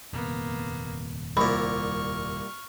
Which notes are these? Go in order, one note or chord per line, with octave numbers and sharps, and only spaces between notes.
D#1 F2 C3 A#3 B3
C2 A#2 B5 C#6 F6